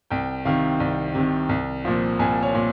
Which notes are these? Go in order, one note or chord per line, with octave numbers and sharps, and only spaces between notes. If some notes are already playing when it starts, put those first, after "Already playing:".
C2 G5
C3 D#3 F5
C2
C3 D#3
C2
A#2 F3
C2 G#5
C#5
A#2